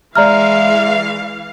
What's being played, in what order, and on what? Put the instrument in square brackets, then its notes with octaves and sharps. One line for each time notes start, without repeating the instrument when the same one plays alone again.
[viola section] E3 F5 [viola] G#3 [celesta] D5 A#5 F6 [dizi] E5